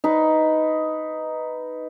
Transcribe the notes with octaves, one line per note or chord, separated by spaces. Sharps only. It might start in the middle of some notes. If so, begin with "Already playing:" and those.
D#4 B4